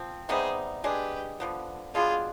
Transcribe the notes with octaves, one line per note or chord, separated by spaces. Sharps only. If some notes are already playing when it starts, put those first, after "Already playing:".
Already playing: F3 C4
C3 G3 B3 D#4 G#4 C5
G#3 D4 G4 G#4 B4
D3 F3 B3
B2 B3 D4 F4 G#4